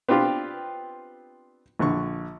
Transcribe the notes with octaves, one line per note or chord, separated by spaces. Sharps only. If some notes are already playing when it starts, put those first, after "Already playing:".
B3 C4 D4 F4 G4
A#1 D3 C#6